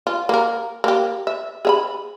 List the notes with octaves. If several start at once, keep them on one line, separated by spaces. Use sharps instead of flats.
F4
A#3 A#4
A#3 G4
E5
G#4 E5 B5